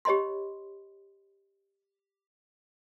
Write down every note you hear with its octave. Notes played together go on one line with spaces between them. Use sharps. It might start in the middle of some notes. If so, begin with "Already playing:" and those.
G4 C#5 D#5 B5 C6